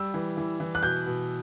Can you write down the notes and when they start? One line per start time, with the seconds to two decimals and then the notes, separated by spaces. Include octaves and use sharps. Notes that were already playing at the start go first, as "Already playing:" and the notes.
Already playing: G3 E6
0.14 E3
0.37 E3
0.60 E3
0.75 F#6
0.83 B2 G6
1.06 B2